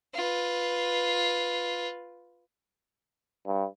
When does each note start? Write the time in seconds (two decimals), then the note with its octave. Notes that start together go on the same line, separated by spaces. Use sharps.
0.15 F4 B4
3.47 G2